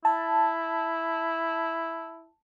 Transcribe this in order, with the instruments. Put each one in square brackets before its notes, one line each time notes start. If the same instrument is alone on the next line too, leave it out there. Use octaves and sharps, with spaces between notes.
[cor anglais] E4 [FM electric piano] A5